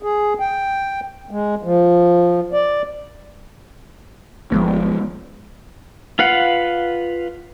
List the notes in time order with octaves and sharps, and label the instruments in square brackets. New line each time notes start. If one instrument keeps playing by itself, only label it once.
[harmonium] G#4
G5
G#3
F3
D5
[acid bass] G1 [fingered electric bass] F3 G#3 B3
[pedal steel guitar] F4 B4 F5 F#5